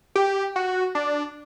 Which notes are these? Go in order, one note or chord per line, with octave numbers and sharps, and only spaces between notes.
G4
F#4
D4